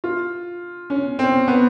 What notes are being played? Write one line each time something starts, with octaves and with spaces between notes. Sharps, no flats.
F4
C#4
C4
B3